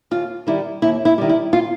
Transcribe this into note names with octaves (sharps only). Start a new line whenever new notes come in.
D#2 F4
D#3 G3 E4
D#2 E4
E4
D#3 G3
E4
F4